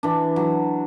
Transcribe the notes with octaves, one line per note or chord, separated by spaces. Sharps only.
E3 D4
F#3